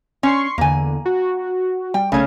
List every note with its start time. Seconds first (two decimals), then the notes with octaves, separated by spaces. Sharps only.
0.23 C#4 C6 C#6 C7
0.58 E2 D3 A#3 G#5
1.05 F#4
1.94 G3 G5
2.12 B1 C#3 A3 C#4 G#6